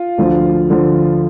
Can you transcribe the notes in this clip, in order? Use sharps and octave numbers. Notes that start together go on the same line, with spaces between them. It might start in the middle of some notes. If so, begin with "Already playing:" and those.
Already playing: F4
D2 D3 F3
D3 F3